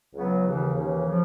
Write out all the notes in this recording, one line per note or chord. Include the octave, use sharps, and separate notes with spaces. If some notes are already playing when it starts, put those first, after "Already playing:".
C#2 C#3 F#3 B3
D#2 C#3 E3
D#2 C#3 E3
C#3 F3